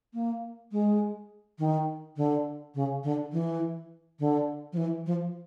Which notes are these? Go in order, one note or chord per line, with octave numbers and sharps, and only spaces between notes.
A#3
G#3
D#3
D3
C#3
D3
E3
D3
F3
E3
F3